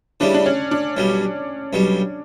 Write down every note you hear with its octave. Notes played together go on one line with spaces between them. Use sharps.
C#3 E3 G3 D4
D4
C#4
D4
B1 B2 G3
B1 B2 G3